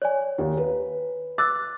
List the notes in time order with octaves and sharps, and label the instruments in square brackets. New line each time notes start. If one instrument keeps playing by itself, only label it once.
[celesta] C#5 D5 G#5
[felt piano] D#2
B4
[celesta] D6 E6 F#6 [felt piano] A6